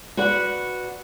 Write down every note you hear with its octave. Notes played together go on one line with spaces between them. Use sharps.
F#4 B4 D5 F#5